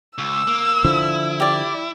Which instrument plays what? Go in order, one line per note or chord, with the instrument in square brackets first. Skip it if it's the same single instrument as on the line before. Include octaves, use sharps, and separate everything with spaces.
[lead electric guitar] C#2 [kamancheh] E6
[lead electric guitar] A#3
[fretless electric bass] D3 F3 [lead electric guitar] E4
[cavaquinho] G4 D5